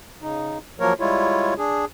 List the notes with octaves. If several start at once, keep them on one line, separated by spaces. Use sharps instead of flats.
C#3 D#4
F3 F#3 A#3 A#4 C#5
G3 G#3 E4 F4 C#5
D4 G#4